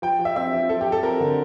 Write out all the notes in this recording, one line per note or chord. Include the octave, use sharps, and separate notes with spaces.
F3 G5
F3
E5
C4 E5
F3
F3 A4
F3 G4
A4
C4 A#4
D3